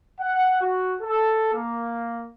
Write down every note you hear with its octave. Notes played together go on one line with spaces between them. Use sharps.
F#5
F#4
A4
A#3